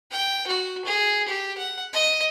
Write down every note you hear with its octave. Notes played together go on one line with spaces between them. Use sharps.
G5
F#4
G#4
G4
F#5
D#5